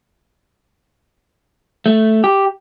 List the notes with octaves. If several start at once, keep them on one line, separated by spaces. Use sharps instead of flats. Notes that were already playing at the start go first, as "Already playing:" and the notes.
A3
G4